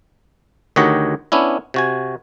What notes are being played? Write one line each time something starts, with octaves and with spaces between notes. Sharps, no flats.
D2 D#3 G4 C#5 D#5 F#5
B3 C#4 D4 E4
C3 F#4 G#5